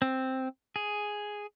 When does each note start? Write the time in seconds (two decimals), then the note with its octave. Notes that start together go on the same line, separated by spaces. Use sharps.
0.02 C4
0.76 G#4